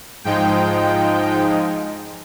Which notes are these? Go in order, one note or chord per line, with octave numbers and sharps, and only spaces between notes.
G#2 F3 G#3 D#4 G5